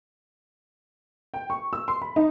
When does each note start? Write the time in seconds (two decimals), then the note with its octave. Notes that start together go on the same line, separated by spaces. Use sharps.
1.34 G5
1.50 C#6
1.73 E6
1.88 C6
2.02 B5
2.16 D#4